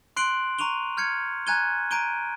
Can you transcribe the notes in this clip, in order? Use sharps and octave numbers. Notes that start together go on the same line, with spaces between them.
C6 F#6 C7 D7 F#7
A#5 C#6 D#7 F7 G7
F6 G6 G#6 C#7
G#5 A#5 F#6 G#6 D#7 G7
A#5 G6 D7 D#7 G7